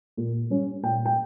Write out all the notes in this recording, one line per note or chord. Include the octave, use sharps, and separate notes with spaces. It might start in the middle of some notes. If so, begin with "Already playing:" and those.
A#2
G3 C#4
A#2 G5
G5